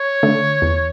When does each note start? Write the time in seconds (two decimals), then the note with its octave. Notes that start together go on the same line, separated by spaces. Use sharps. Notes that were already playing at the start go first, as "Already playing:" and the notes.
Already playing: C#5
0.23 D3 A3
0.62 E2